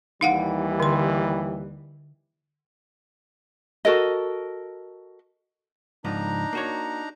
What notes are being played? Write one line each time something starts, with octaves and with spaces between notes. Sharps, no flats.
D#2 E3 G3 D#4 F5 F#5
D3 C6
F#4 A4 A#4 D#5
C#2 G#2 F3 D4 D#4 A#5
A#3 F#4 C#5